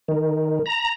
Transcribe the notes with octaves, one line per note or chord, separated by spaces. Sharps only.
D#3
A#5